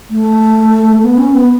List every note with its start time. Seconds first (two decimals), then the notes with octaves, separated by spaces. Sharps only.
0.10 A3
1.03 B3
1.17 C#4
1.33 B3